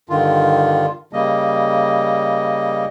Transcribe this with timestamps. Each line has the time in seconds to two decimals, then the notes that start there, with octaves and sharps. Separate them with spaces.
0.09 G2 D3 D#3 F4
1.13 C#3 G3 A#3 D#5